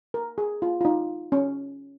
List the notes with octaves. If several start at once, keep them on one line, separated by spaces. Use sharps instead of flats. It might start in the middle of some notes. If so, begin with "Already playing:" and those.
A#4
G#4
F4
F4
D#4
C#4